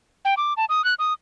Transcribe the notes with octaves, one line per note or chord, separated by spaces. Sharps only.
G5
D6
A5
D#6
F#6
D#6